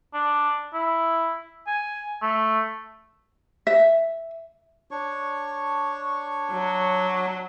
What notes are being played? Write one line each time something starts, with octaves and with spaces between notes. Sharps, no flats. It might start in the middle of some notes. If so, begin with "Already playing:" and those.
D4
E4
G#5
A3
E5
D4 C#5 C#6
F#3